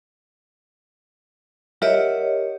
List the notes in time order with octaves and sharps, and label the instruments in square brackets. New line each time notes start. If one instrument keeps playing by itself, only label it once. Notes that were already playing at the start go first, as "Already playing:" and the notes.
[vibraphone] G4 C#5 D#5 [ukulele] A#4 E5 F#5